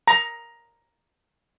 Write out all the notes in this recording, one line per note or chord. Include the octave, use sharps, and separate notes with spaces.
A#5